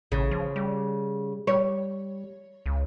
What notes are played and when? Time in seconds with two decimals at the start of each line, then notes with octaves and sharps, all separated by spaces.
0.12 A1 C#3
0.31 F3
0.56 G3
1.47 G3 C#5
2.66 C#2